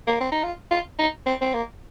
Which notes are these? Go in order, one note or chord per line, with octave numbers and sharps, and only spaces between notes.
A#3
C4
D#4
F4
F4
D#4
C4
C4
A#3